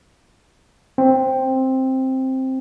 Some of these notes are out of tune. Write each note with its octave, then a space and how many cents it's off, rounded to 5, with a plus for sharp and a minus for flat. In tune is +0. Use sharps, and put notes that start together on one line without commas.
C4 +5